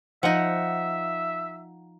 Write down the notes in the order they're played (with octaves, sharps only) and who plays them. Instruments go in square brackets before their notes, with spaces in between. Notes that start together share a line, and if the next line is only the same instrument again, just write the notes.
[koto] F3 D#4 [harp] D#5 F#5 [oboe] E5